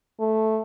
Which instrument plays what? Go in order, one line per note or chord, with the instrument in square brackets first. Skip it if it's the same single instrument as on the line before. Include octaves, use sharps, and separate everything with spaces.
[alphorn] A3